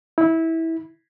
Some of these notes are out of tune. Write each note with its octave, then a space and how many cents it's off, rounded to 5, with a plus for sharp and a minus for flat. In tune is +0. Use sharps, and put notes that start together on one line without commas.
E4 -20